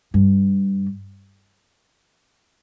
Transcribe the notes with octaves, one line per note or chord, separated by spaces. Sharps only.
G2